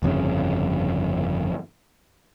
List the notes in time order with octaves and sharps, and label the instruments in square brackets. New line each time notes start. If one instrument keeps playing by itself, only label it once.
[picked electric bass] G1 F2 A#2 C#3